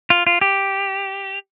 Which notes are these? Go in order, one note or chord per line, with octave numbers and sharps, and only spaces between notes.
F4
F4
G4